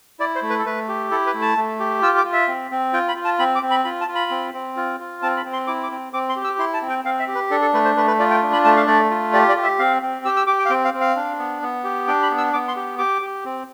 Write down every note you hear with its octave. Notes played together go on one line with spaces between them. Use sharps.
E4 D5
C5
A3
B4
A4
A3 B4
G4
E4 A4
B4
A3
A5
A3
G4
F4 E6
D6
F4
E5
C4
C4
F4 G5
B5
F4
A5
C4 B5
D6
C4
B5
F4 B5
A5
F4
B5
C4
C4
F4
F4
C4 A5
B5
C4
C6
E4 D6
D6
C4
C4 D6
C6
G4
E6
E4 C6
A5
C4
G5
C4 F5
E5
G4
B4
D4 A4
A4
A3 B4
C5
A3 B4
B4
F4 D5
G5
D4
B5
A3 A5
F5
A3 D5
F4
G4 D5
D5
G4
E5
C4 F5
C4
G4 E6
E6
G4 D6
G5
F5
C4 G5
F5
C4
F5
D4
B3
B3
G4
D4 G5
B5
B3
E6
B3 D6
C6
G4
G4 D6
G4
C4